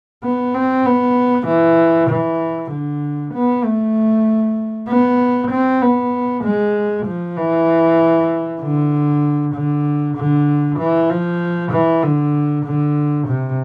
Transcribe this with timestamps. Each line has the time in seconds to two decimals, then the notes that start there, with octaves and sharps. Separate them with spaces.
0.24 B3
0.54 C4
0.86 B3
1.47 E3
2.09 E3
2.71 D3
3.34 B3
3.65 A3
4.88 B3
5.51 C4
5.82 B3
6.44 G#3
7.06 F3
7.37 E3
8.62 D3
9.55 D3
10.16 D3
10.79 E3
11.10 F3
11.72 E3
12.03 D3
12.65 D3
13.27 C3